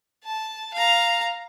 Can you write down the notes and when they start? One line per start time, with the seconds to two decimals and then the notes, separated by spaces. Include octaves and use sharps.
0.24 A5
0.74 F5 A#5